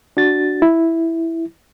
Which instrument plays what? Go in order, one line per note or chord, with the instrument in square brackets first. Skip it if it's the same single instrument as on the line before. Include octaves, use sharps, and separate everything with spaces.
[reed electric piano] D4 F#4 A6
E4